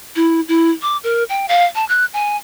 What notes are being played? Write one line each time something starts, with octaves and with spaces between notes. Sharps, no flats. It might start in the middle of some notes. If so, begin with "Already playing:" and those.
E4
E4
D6
A#4
G5
F5
A5
F#6
G#5